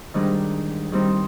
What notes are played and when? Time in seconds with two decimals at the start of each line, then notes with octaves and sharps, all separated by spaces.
0.14 G#2 D#3 G3 D4
0.92 D#3 G3 C4 D#4